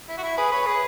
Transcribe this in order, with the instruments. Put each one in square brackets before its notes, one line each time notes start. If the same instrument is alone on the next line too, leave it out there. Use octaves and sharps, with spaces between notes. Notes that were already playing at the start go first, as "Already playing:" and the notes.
[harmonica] E4
F#4
E4
[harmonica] G#4 [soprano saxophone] B4
[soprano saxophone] B4 [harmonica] C#5
[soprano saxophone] G#4 [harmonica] B4